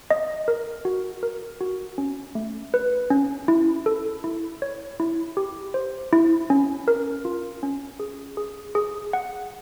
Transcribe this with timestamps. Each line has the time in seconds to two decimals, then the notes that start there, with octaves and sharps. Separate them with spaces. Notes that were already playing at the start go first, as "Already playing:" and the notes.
0.11 D#5
0.48 A#4
0.85 F#4
1.23 A#4
1.61 F#4
1.98 C#4
2.35 A3
2.74 B4
3.10 C#4
3.48 E4
3.86 A4
4.24 E4
4.62 C#5
5.00 E4
5.37 G4
5.74 C5
6.13 E4
6.50 C#4
6.88 A#4
7.25 F4
7.63 C#4
8.00 G#4
8.37 G#4
8.75 G#4
9.13 F#5